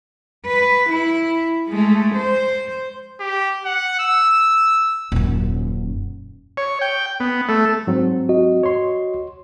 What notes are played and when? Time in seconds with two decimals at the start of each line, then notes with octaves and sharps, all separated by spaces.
0.46 B4
0.90 E4
1.69 G#3 A3
2.15 C5
3.20 G4
3.65 F#5
4.00 E6
5.12 D#1 F#2
6.57 C#5
6.81 G5
7.20 B3
7.49 A3
7.87 G#2 F#3 C4
8.29 F#4 D#5
8.63 C#5 C6